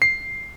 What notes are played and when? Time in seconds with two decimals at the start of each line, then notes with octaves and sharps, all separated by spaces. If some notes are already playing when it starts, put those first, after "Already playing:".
0.02 C7